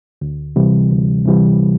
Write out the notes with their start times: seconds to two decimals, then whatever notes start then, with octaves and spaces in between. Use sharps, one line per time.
0.21 D2
0.56 C3 E3 G3
0.91 D2
1.26 C3 E3 G3